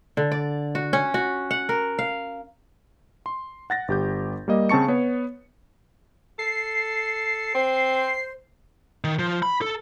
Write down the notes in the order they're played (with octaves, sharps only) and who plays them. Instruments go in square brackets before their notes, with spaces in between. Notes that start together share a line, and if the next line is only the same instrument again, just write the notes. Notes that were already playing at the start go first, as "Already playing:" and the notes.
[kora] D3
D5
F#4
C#4
F#4
F#5
A#4
F5
[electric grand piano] C6
F#5 A6 A#6
G1 G4 G6
G3 A#3 D#5
C#3 C4 A5 C#6 C#7
B3 C#5
[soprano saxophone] A4 [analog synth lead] C7
[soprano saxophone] C4 [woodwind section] C5
[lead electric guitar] D#3
F3
B5
A4